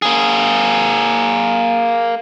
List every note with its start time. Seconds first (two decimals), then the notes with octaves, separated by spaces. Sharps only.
0.02 A#3 G#4